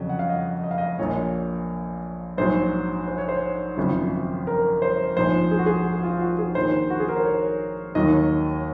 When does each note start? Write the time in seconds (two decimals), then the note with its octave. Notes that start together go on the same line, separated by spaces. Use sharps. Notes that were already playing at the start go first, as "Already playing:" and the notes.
Already playing: F2 C#3 F#3
0.09 F#5
0.19 F5
0.29 D#5
0.64 D#5
0.71 F5
0.78 D#5
0.99 A#1 A#2 F3 C#5
2.38 A#1 G#2 F#3 C5
3.07 C5
3.18 C#5
3.28 C5
3.77 G#1 F#2 C#3 F3
4.47 A#4
4.82 C5
5.16 A#1 G#2 F3 C5
5.51 G#4
5.59 F#4
5.66 G#4
6.03 F4
6.21 F#4
6.39 G#4
6.55 A#1 G#2 D#3 C5
6.90 F#4
7.00 G#4
7.08 A#4
7.16 C5
7.25 C#5
7.95 D#2 D#3 F#3 D#5